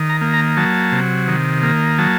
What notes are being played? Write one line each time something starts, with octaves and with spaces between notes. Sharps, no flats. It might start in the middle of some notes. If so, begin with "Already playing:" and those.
Already playing: D#3
A#5
A#3
A#5
F#3 A5
C3
D#3
A#3
F#3 A5